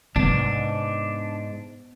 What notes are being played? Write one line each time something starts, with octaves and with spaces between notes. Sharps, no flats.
G#2 C3 B3 D4